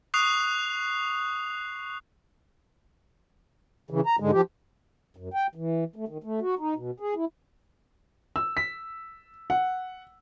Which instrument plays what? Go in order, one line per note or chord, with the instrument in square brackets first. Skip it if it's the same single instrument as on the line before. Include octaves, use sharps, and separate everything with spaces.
[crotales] C#6 D#6 F#6 C7 F7
[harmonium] C#3 E3
A#5
G#2 D3 G#3
F3 G4
F#2
G5
E3
A3
D#3
A3
F#4
D#4
B2
G#4
E4
[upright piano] E6
B6
F#5